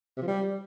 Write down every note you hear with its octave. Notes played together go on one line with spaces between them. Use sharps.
C3
F3
G3